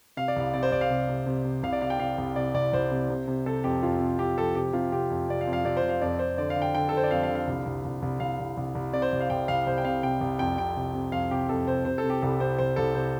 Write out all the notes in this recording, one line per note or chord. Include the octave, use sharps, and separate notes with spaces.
C3 F5
D5
C2 F5
C3 D5
C5
C2 D5
F5
C3
C3
C3
C3
C2 F5
D5
C3 F5
G5
C3 F5
C2
C3 D5
C2 D5
C2 C5
C3
C3
C3
C3 A4
F2 G4
F2 F4
C3
C3 G4
F2 A4
C3 G4
C3 F4
C3 G4
F2
C3 D5
F5
F2
F5
C3 D5
C5
C3
F5
F2 D5
F2 C5
D3 D5
F5
D3
G5
D3 G5
A4
D3 C5
D5
F2 F5
F5
D3
F5
C2
C2
C2
C2
C2 F5
C2
C2
C2
C3 D5
C5
C2
F5
C2 G5
C2 F5
C2 C5
G5
C3 F5
C3 G5
C2
F2 G5
C3 G5
C3
C3
F2 F5
C3 G4
F2 A4
C3 C5
C3 C5
A4
C3
G4
C2 A4
C3 C5
C2 C5
C2 A4
C3 C5